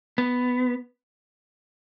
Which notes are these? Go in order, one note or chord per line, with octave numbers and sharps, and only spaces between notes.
B3